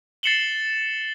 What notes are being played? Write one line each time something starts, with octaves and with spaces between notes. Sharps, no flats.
A6 C7 C#7 E7 F#7 G7